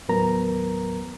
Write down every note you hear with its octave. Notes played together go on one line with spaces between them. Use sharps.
D#2 A2 F#3 B3 A#4 A#5